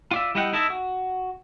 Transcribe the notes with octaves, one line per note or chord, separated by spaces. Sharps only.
F4 D5 E5
G3 E4 D#5 E5 F#5 G5
D#4 E4 A4 D#5 E5
F#4